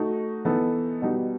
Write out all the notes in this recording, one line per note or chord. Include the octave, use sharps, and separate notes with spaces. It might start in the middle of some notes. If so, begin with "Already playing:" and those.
Already playing: A3 D#4 F#4
E3 B3 D#4 A4
B2 G3 D#4